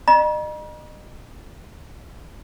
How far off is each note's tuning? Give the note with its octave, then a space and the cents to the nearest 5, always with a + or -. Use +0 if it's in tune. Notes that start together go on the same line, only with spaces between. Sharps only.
D#5 -40 A#5 +45